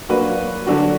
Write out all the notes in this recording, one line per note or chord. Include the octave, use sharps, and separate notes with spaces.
F#3 A#3 D4 F#4 B4
D3 F#3 D4 F#4